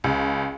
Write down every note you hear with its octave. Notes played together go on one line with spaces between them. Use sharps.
C#2